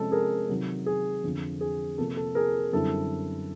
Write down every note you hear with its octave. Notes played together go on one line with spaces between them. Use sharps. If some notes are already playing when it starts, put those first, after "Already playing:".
Already playing: C3 F3 G#3 C#4 A4
G#4 A#4
C3 D#3 F#3
G#4
F2 D3 F3
G#4
C3 F3 A#3 A4
A4
G#4 A#4
F#2 D3 G3 C4 E4 A4